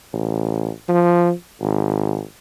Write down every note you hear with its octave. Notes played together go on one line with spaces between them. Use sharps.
A1
F3
G#1